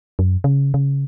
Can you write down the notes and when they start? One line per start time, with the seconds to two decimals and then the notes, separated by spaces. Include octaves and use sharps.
0.19 F#2
0.44 C#3
0.74 C#3